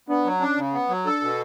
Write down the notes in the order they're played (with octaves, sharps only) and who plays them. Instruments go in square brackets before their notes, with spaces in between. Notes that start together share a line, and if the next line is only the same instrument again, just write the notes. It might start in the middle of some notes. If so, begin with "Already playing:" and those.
[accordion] B3 [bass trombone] D4
[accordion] F#3
[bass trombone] C#4 [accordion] D4
[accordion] C#3
B3
F#3
[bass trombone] D4 [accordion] A4
[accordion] B2